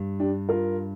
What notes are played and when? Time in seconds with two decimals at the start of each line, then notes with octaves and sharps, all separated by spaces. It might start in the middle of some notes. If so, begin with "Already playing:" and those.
Already playing: G2
0.20 D4 G4
0.49 F4 A#4